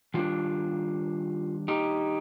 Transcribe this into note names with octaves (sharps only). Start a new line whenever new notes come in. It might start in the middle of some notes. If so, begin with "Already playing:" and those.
D#3 G3 D4 F4
D#4 G4